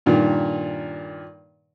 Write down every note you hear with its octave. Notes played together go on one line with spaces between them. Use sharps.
G2 A#2 D#3